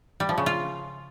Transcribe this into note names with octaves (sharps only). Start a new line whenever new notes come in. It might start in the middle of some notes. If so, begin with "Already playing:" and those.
G3
F3
C#3
F4